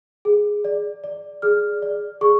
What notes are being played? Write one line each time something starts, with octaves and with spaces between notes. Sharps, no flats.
G#4
D5
D5
G#4 F6
D5
G#4 C#6